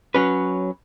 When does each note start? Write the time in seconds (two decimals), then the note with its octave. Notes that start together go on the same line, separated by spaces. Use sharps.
0.14 F#3 C#4 B4